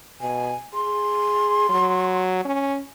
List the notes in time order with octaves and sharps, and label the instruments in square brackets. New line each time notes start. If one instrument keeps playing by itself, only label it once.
[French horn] B2 [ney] G#5
[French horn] G#4 [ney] C6
[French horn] F#3
C#4